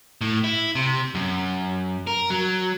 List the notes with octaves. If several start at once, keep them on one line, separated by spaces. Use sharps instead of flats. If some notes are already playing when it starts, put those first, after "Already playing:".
A2
E4
C3
F#2
A#4
F#3